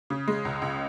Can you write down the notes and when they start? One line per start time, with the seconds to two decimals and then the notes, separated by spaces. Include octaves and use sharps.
0.10 C#3
0.28 G#3
0.45 C#2
0.62 C#2